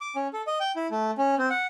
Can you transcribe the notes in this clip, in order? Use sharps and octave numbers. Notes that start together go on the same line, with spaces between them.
D6
C#4
A4
D#5
G5
E4
A3
C#4
C4
F#5